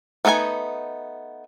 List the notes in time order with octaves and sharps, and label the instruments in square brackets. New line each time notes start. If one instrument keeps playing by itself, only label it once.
[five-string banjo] A3 B3 D#4 A#4 G#5